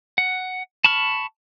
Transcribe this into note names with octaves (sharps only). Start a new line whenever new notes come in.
F#5
A5 B5 C#6 F6